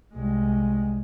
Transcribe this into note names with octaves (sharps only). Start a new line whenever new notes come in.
C2 G#3